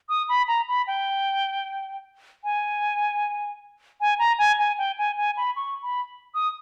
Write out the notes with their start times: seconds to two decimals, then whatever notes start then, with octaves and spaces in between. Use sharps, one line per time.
0.09 D#6
0.29 B5
0.48 A#5
0.68 B5
0.87 G5
2.44 G#5
4.01 G#5
4.19 A#5
4.38 G#5
4.59 G#5
4.78 G5
4.98 G#5
5.17 G#5
5.37 B5
5.56 C#6
5.82 B5
6.34 D#6